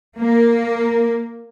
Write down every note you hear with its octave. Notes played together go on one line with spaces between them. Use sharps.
A#3